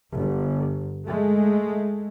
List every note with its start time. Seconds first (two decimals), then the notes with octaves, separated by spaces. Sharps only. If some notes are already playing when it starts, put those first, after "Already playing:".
0.15 G1
1.06 G#3 A3